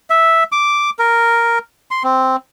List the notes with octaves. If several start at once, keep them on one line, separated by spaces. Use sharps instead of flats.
E5
D6
A#4
C6
C4